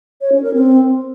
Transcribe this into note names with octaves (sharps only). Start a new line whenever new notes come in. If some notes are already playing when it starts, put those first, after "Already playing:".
C#5
C#4
A#4
C4